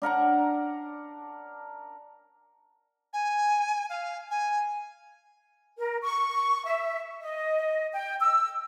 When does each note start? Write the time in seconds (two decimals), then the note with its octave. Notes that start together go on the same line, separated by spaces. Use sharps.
0.02 D4 A#4 F#5 A#5
3.13 G#5
3.89 F5
4.31 G#5
5.77 A#4
6.03 C#6
6.65 E5
7.21 D#5
7.92 G5
8.20 E6